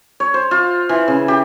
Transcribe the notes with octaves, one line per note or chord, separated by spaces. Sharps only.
C#5
C5
F4
E3
C#3
G4